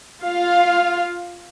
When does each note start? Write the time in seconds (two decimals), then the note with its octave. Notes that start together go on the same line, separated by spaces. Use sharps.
0.23 F4 F5